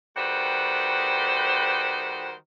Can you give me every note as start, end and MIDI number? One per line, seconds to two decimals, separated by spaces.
0.17 2.32 51
0.17 2.32 55
0.17 2.32 57
0.17 2.32 66
0.17 2.32 71
0.17 2.32 72